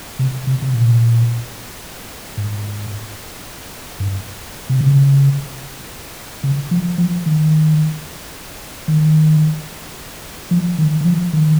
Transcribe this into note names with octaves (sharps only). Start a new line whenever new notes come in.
C3
C3
C3
A#2
G#2
G2
C3
C#3
C#3
F3
F3
D#3
D#3
F3
D#3
D#3
F3
D#3